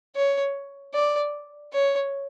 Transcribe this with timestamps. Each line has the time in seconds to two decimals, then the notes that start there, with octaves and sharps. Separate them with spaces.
0.16 C#5
0.94 D5
1.73 C#5